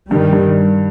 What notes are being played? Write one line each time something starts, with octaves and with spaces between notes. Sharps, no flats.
G2 D#3 G3
G2